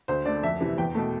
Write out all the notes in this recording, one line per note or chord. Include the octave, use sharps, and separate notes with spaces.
D2 C5
D3 A3 D5
F2 E5
C3 E3
E2 G5
B2 A3